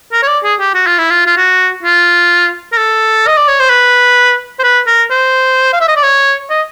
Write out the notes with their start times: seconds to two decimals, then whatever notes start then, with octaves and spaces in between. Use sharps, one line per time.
0.13 A#4
0.23 C#5
0.28 D5
0.44 G#4
0.59 G4
0.74 F#4
0.87 F4
0.98 E4
1.11 F4
1.27 F4
1.37 F#4
1.83 F4
2.72 A#4
2.77 A4
3.27 D#5
3.37 D5
3.48 C#5
3.60 C5
3.70 B4
4.59 C5
4.64 B4
4.87 A#4
5.10 C5
5.73 F5
5.80 E5
5.88 D#5
5.96 D5
6.03 C#5
6.50 D#5